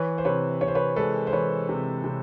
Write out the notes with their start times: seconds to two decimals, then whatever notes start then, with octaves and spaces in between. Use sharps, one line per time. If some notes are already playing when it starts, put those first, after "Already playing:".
Already playing: E3 B4 C#5
0.18 C5
0.25 C3 B4 C#5
0.61 C3 C#5
0.68 C5
0.75 B4 C#5
0.96 G#3 A4 B4
1.27 C5
1.32 E3 B4 C#5
1.69 C3
2.04 C3